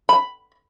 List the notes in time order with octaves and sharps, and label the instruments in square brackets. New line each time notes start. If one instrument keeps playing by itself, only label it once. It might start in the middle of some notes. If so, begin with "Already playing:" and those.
[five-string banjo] B5